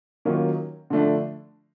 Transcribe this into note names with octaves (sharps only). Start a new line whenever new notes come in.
D#3 F#3 A#3 C#4 F4
D3 F3 A3 D4